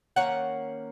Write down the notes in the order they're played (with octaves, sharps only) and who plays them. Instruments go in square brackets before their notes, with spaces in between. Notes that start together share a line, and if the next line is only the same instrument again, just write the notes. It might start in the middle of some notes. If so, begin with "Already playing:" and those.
[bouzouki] D#3 A#3 C#4 F#5 A#5